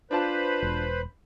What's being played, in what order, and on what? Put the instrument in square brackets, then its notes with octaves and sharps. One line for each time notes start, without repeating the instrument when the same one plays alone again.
[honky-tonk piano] D4 F4 A5 [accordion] B4 C5 B5
[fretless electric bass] E1